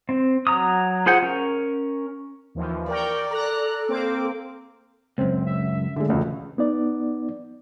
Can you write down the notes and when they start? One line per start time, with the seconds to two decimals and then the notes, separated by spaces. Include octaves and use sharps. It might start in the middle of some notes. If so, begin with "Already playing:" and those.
0.09 C4
0.47 F#3 A#5 D#6
1.06 F4 G#4 C5 F#5 G5
1.22 C#4 A#4
2.55 D#2 E3 F3
2.89 A#4 D5 G5 C#6
3.31 A4 A#5 F#6
3.88 A#3 C4 D6
5.18 C#2 F#2 C4
5.46 E5
5.96 D3 G#3
6.09 E1 C#2 A3
6.58 B3 D#4 D5